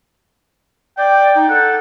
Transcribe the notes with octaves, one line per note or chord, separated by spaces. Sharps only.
D5 G5
D#4
A4 F#5